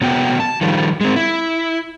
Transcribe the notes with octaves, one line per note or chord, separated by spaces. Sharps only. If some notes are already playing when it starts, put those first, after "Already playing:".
C3 F#3 B3 F#4 G5
A5
D#3 F3 G3
G#3 C4
E4